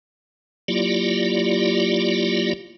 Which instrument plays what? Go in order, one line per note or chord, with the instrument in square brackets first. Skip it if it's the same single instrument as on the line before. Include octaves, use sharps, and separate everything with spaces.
[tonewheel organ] F#3 A#3 E4 F4 G4 D5